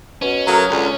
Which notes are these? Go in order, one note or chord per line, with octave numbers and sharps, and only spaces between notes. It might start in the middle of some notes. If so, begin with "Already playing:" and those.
B2 C#4
C#3 F#3 A3 A#4 A#5 D#6 F6
C#2 D3